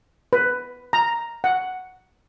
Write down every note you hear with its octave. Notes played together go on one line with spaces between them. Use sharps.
B4
A#5
F#5